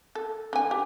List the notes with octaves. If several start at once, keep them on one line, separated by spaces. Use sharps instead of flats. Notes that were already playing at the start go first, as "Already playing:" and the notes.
A4
D3 G#5
G4